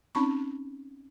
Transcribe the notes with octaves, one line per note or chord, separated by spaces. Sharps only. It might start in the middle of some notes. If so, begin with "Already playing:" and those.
C4 C#4 D#4 B5 C#6